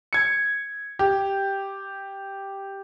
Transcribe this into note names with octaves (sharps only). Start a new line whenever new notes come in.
G#6 C#7
G4